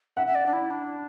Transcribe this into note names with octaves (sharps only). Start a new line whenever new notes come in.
E5 F#5
E5
D5
D4
E4
D4